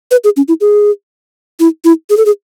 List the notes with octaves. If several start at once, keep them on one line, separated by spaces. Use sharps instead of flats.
B4
G#4
C#4
E4
G#4
E4
E4
G#4
A4
G#4